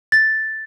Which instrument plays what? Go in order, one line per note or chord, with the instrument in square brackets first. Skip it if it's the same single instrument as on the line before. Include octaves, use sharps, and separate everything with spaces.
[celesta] A6